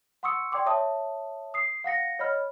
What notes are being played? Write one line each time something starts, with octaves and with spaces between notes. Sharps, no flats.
F#5 C6 C#6 D#6 E6 C#7
D5 G5 C6 D6
C#5 E5 A5 D#6
D#6 C7
F5 F#5 A#6 C#7
C#5 D#5 B5 F6